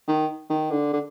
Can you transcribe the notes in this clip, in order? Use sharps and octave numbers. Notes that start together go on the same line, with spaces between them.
D#3
D#3
D3
D3